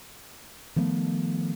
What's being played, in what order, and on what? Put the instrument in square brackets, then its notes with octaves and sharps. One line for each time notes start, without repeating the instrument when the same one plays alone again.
[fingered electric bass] D#3 F3 A3 B3